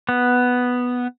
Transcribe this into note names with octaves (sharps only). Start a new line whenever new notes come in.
B3